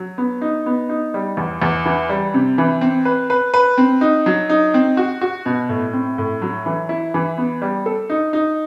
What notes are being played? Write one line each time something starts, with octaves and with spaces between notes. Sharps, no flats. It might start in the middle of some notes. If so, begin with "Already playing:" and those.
Already playing: F#3
B3
D#4
B3
D#4
G3
E2
E2
E3
G3
C3
E3
C4
B4
B4
B4
C4
D#4
F#3
D#4
C4
F#4
F#4
B2
A2
C4
A2
F#3
E3
E4
E3
B3
G3
A4
D#4
D#4